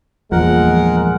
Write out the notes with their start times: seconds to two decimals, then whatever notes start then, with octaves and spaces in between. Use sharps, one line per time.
0.32 E2 G2 A#2 F3 G#3 A#4 F#5